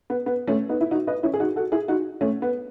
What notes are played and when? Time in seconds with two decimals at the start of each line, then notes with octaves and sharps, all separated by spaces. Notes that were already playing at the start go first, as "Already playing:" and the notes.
0.10 B3
0.26 B3
0.47 A3 C#4
0.69 B3 D#4
0.81 E4
0.91 D#4 F#4
1.07 B4 D#5
1.23 C#4 E4
1.34 G#4
1.40 D#4 F#4
1.56 F#4 A4
1.72 E4 G#4
1.88 D#4 F#4
2.21 A3 C#4
2.42 B3